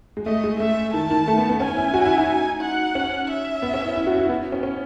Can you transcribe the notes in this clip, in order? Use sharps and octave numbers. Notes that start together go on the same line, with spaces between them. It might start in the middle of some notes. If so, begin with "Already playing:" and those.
G#3
A3 D#5
G#3
A3 E5
D#3 A5
D#3
A3
B3
B3
C#4 G#5
E4
F#4
E4
D#4
F#5
C#4
E5
B3
C#4
E4
E4
F#4
E4
B3
C#4
C#4